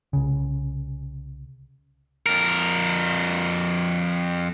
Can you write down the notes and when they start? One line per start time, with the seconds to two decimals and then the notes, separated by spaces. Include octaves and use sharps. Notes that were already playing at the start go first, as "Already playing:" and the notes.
0.13 C2 C#3
2.26 F2 A#4